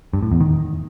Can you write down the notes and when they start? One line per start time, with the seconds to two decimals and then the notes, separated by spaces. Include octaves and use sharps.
0.13 G2
0.23 A2
0.32 E2
0.41 D#3